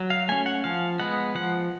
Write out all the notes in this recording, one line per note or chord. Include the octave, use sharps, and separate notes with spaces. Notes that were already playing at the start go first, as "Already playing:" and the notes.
Already playing: F#3
F5
A3 C#4 G#5
F#5
F3 F5
G#3 B3 F#5
F3 F#5